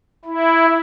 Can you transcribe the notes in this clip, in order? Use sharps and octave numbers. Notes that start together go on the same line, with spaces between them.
E4